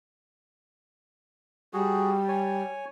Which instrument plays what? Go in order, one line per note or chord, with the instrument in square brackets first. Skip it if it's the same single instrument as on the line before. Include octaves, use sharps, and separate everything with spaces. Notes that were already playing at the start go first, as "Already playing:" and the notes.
[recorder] G3 [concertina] F#4 G#4
[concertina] C#5 G#5